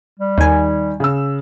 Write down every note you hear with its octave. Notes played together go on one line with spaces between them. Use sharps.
G3
D#2 D#3 G#5
C#3 E6